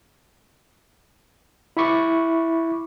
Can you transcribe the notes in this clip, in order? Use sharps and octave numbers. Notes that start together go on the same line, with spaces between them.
E4 E5 B5 C#6 D6